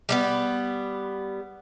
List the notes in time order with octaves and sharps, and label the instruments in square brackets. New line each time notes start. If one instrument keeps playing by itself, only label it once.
[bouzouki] G3 A#3 B3